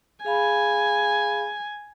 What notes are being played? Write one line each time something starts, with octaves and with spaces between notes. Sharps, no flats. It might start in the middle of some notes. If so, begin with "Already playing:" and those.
G#4 F5 G#5 B5